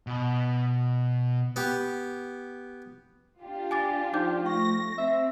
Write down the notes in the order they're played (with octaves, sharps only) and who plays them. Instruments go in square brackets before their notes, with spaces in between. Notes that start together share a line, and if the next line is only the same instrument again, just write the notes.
[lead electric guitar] B2 B5
[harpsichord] B3 G4
[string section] D4 F4 G4
[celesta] G#5 D6 A6
[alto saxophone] F3 [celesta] D#4 D6 G6
[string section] A3 A#6 [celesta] C#6
[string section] C4 [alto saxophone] E5